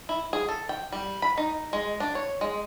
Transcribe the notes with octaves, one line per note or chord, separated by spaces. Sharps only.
E4
G#4
A4
G5
G3
B5
D#4
G#3
D4
C#5
G#3